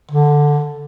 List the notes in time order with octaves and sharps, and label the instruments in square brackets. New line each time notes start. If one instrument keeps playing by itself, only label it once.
[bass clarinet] D3